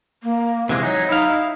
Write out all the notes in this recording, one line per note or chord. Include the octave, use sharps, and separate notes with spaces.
A#3
C3 E3 G#3
F#3 D#4 C#5
D#4 E4 F5